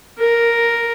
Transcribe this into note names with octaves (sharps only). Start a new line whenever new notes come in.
A#4